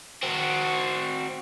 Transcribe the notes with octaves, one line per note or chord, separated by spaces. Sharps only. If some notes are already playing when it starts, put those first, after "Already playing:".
C4 F#4